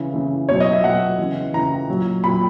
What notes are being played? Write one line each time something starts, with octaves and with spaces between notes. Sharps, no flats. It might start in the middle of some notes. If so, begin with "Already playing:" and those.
Already playing: C#3 E3
C#3 E3
B2 F#3 C#5
D#5
E5
B2 F#3 F#5
E3
C#3
C#3 E3 A#5
A#2 F#3
A#2 F#3 B5